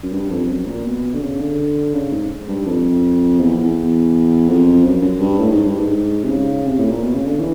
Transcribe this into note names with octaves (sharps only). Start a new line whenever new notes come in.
F#2
G2
F2
F#2
A#2
B2
D3
C#3
D3
C#3
G#2
G2
F2
E2
E2
F2
F#2
F#2
G2
A2
G#2
G2
G#2
C3
C#3
C3
A2
A#2
B2
C#3
D3
E3